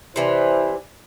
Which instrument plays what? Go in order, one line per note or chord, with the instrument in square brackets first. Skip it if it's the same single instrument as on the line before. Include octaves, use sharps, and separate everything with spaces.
[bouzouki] C3 E3 D4 [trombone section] E4 C5